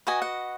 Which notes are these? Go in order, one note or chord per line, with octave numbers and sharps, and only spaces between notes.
F#4 B4 D#5 G#5
F#5